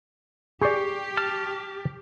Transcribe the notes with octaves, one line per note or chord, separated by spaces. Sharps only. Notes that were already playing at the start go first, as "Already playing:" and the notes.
G4 G#4 D5 C#6 G6 C7
A5 F6